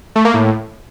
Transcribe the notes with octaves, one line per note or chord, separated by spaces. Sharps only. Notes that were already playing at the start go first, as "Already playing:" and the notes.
A3
A#3
A2